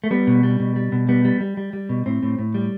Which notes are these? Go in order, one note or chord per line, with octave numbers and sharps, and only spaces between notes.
A3
G3 B3
B2
G3
B2
G3
B2
G3 B3
G3
G3
G3
G3
B2
A2 C4
A2
A2
G3